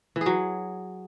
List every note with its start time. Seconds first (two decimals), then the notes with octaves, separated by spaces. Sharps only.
0.16 E3
0.21 G#4
0.26 F#3